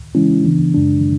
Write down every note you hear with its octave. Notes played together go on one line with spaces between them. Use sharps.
C#3 E3 G#3 C#4 E4
C#3 E3 B3 D4
F#2 C#3 G#3 D4